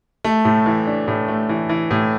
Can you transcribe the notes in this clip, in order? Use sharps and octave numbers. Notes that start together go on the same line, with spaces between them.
A3
A2
E3
D4
A2
A3
E3
E3
A2